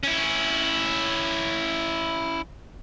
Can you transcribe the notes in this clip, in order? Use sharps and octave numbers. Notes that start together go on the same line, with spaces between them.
C#4 E4